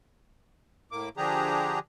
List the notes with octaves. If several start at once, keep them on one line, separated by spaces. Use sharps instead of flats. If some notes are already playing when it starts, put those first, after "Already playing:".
A2 A#3 D6
D3 F3 D4 G4 G#4 A#5